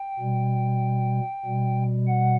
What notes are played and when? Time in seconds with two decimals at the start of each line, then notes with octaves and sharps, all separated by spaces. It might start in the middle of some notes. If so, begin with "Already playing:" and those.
Already playing: G5
0.19 B2 G3
1.45 B2 G3
2.08 F#5